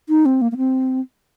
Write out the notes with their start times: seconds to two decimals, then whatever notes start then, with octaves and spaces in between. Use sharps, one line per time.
0.09 D#4
0.26 C4
0.42 A#3
0.52 A#3
0.57 C4